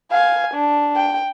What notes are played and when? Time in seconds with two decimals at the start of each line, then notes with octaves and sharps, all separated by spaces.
0.11 F5 G#5
0.54 D4
0.96 G5